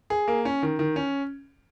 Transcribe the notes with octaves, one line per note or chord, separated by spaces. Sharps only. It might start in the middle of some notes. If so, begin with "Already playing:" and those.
G#4
A#3
C#4
D#3
D#3
C#4